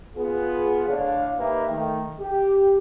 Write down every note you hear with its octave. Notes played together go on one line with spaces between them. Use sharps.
B3 F4 G#4
A2 D3 D4 C#5 F5
A#3 D#4 G4 B4 D#5 E5
D#3 A3
G4